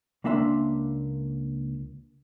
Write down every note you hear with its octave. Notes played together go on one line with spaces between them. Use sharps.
C#2 A#3 D4 E5 A5 C6